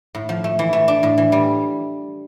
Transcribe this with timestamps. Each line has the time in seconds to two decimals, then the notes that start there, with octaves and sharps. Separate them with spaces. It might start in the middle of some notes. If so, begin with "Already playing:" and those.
0.15 A2
0.29 F3
0.44 A3
0.59 E3
0.73 A3
0.88 D4
1.03 A2
1.18 E3
1.32 G3